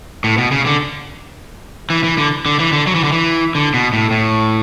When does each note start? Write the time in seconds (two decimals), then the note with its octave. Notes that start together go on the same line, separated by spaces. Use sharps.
0.24 A2
0.38 B2
0.51 C#3
0.66 D3
1.90 E3
2.04 E3
2.18 D3
2.46 D3
2.59 E3
2.72 D3
2.87 F#3
2.95 E3
3.04 D3
3.12 E3
3.55 D3
3.74 B2
3.93 A2
4.11 A2